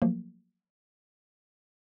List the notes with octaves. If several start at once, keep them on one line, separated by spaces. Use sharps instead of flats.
F3 F#3 A3 A#3